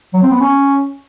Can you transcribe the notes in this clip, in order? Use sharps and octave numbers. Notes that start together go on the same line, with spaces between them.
F#3
C4
B3
C#4